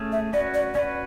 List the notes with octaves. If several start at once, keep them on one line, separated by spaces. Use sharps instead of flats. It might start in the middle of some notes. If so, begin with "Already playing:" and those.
Already playing: A3 C#4 G#4
E5
C#4 F#4 B4 D5
D5
C#4 F#4 B4 D5